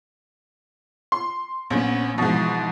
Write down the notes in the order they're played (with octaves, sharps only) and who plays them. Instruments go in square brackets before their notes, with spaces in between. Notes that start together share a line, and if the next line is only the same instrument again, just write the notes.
[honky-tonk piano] C6
[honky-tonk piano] A#1 [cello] B3 C#4
[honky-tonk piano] G#2 B2 [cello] E3 F3